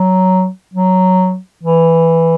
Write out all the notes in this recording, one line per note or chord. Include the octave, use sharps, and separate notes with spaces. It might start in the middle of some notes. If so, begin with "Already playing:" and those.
Already playing: F#3
F#3
E3